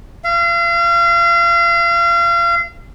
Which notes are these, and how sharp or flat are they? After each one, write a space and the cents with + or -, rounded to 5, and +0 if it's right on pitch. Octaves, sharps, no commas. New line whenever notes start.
F5 -35